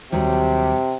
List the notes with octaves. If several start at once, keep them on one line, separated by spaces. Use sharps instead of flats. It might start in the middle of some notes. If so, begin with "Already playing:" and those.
D#2 C3 F#3 G3